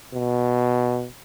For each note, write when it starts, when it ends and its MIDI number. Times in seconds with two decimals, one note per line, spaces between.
0.14 1.07 47